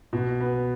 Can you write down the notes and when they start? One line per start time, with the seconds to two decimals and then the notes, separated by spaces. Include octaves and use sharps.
0.13 B2
0.40 B3